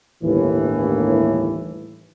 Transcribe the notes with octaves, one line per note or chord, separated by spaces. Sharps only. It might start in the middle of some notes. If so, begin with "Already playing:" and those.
G1 D#2 A2 E3